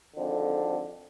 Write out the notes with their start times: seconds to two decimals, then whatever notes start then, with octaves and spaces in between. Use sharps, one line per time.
0.16 G#1 F2 D3